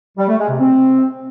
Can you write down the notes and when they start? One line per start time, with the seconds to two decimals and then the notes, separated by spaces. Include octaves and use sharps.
0.18 G3
0.28 A3
0.39 G#3
0.49 C3
0.60 C4